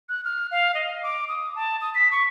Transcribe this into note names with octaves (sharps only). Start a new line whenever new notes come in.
F#6
F6
F5
D#5
D6
D#6
A5
D#6
B6
C#6